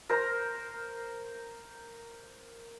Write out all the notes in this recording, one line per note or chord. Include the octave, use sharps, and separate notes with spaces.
A#4 C5 A#5